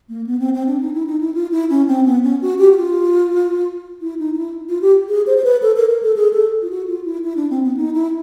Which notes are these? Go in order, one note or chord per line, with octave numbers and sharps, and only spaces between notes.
A#3
B3
C4
C4
D4
D#4
E4
D#4
E4
F4
E4
C#4
C4
B3
C#4
F#4
G4
F#4
F4
E4
D#4
D#4
E4
F4
G4
G#4
C5
C5
B4
A4
A#4
A#4
A4
G#4
A4
F4
F#4
F4
E4
E4
D4
C4
B3
D#4
E4